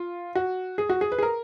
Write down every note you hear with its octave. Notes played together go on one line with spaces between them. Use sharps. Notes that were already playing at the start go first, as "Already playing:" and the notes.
Already playing: F4
F#4
G#4
F#4
G#4
B4
G#4
A#4